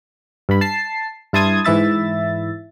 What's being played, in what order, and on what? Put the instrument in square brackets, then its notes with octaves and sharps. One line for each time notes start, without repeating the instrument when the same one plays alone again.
[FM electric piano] G2 B5
A5 C7
G2 E4 A5 C6 D#6 G#6
G#2 E3 E4 E5 A6